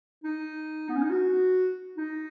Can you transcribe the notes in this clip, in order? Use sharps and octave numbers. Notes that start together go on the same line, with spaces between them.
D#4
B3
C#4
D#4
F#4
D#4